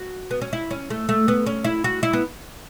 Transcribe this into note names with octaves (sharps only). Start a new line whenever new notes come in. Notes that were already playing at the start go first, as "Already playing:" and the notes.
Already playing: F#4
B3
C#4
E4
C#4
A3
A3
B3
C#4
E4
F#4
E4
B3